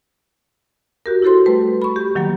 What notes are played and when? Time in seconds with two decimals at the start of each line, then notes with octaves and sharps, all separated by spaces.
1.06 F#4 G4 A#4
1.22 E4 F#4 A4 C5 C6
1.46 G3 A3 B4
1.82 B5 C#6
1.96 G4
2.15 D#3 F#3 G3 A#3